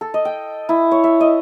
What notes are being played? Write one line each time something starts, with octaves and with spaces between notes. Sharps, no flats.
A4
D#5
G5
E4
C#5
E5
D#5